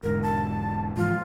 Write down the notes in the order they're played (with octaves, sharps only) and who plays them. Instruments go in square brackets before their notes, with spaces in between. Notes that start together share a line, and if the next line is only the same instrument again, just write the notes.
[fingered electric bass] E1 G#2 D3 [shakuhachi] A#4
[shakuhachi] A5
[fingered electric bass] G#2 E3 F3 [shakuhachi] F4